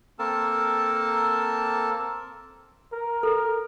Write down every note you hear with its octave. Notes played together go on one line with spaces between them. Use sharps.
A#3 C4 A4 A#4 A5
A#4
A4 A#4